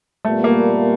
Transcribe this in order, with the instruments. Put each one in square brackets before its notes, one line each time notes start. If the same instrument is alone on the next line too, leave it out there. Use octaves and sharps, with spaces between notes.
[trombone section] A#2 G3 B3 [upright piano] A3
[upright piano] A#3